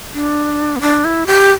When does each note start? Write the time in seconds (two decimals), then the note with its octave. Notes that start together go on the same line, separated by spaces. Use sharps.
0.14 D4
0.76 B3
0.81 D4
1.05 E4
1.27 G4